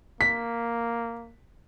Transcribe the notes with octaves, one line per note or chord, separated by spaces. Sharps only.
A#3 B6